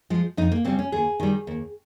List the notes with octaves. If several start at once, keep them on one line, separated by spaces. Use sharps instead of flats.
F3 G#3
F2 D#4
A#3
C#3 G3 C4
C#4
D#2 G#4
D#3 G3
D#2